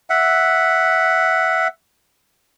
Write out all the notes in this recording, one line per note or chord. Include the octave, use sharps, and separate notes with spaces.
E5 F#5